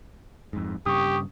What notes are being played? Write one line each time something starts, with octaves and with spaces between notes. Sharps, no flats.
F2 G#2
G2 C#3 G4 C#6 D#6